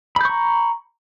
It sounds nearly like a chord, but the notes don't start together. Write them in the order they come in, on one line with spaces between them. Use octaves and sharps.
B5 G6 C#6 A#5